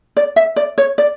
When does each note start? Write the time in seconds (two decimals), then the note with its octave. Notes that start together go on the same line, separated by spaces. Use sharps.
0.17 D5
0.36 E5
0.56 D5
0.78 C#5
0.98 D5